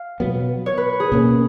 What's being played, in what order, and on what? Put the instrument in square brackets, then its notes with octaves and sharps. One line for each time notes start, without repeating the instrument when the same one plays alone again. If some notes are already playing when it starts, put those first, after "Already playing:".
Already playing: [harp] F5
[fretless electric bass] B2 F#3 B3
[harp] C#5
B4
G#4
[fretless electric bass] B2 A#3 C#4